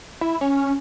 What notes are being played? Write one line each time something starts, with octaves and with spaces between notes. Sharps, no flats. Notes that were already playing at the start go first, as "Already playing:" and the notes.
E4
C#4